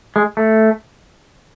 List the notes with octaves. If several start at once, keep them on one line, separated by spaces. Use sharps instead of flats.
G#3
A3